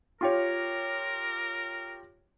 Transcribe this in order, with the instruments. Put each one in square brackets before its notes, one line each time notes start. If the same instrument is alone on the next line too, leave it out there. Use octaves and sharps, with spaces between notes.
[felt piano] F4 G4 C#5 [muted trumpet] A#4